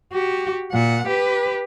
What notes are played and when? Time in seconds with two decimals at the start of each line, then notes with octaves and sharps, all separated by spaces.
0.13 F#4 G4
0.72 A#2 F#5
1.07 G4 B4